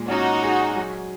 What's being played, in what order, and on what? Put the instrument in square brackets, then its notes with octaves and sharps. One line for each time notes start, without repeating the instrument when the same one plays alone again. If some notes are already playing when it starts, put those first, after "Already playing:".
Already playing: [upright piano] A#2 G#3
[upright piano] C#4 [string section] D#4 F#4
[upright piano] G#4
F#3